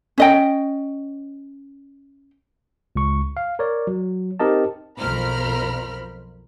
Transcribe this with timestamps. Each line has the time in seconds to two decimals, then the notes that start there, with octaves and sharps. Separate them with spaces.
0.18 C#4 D#5 G5
2.96 C#2 C#6
3.37 F5
3.59 A#4 C#5 D5
3.87 F#3
4.40 C4 D#4 G4 A#4 D#5 A5
4.99 B1 F2 A#4 C5 B5 F6